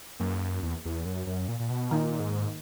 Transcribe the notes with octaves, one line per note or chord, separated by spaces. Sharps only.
F#2 A#3 D#4 G#4 B4
E2
E2
F#2
F#2
A#2
A#2
B2
A#2 D#3 A#3 D#4
G#2